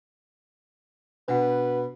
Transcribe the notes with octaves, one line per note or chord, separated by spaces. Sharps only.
B2 D4 F#4 B4 F#5